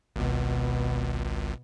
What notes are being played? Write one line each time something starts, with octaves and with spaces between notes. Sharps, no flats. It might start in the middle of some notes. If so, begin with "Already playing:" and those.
G#1 C#2 B2